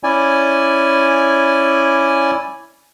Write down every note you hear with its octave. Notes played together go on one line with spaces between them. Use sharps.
C#4 E4 D5 G#5